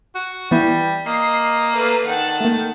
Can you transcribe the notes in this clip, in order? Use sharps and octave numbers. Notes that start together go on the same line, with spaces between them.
F#4
E3 G3 B3 E4
A#3 D#5 C7
A3 B4
D#3 F#5 A5
A3 A#3